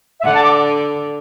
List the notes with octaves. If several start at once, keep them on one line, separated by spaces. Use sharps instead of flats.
E5
D3 F#5
A5
D6